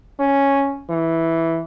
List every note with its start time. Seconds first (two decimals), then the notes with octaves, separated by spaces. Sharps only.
0.19 C#4
0.90 E3